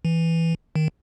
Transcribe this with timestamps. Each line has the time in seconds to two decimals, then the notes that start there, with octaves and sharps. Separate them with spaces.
0.05 E3
0.76 D#3